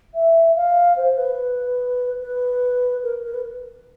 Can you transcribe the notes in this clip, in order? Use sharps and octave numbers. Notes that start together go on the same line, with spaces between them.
E5
F5
C5
B4
B4
A#4
A#4
B4